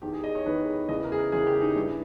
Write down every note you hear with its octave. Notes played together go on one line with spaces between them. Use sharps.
E2 D#3 G4
G#4
D#5
C#5
E2 D#3 B4
B4
E2 C#3 E3 D#5
A#4
G#4
A#4
E2 C#3 E3 G#4
G4
D#4
G2 E3